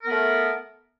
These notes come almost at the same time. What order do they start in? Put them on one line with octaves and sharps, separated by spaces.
A#4 B3 A3